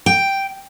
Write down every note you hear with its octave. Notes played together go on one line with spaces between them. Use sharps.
G5